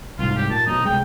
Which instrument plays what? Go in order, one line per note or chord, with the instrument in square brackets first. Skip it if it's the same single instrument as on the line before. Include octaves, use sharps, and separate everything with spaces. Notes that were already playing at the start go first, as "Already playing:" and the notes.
[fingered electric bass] C2 G#2 [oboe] F4
[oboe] G4
[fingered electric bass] A#2 [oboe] A5
[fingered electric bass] F#2 B2 [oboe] D#4
[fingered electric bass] C2 G#3 [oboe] G5